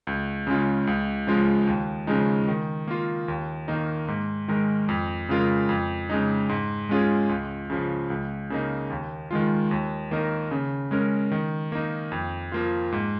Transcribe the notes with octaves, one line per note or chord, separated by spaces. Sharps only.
C#2
C#3 G#3 C#4 F4
C#2
C#3 F3 G#3 F4
D#2
C#3 F3 G#3 D#4
D#3
A#3 F4
D#2
D#3 A#3 D#4
G#2
D#3 G#3 D#4 A#4
F2
C#3 G#3 F4 A#4
F2
C#3 G#3 D#4
G#2
G#3 C#4 F4 G#4
C#2
C#3 F3
C#2
C#3 A#3 D#4
D#2
D#3 G#3 F4
D#2
D#3 A#3 D#4 A#4
C#3
G#3 C#4 A#4
D#3
A#3 D#4
F2
F3 A#3 F4
G#2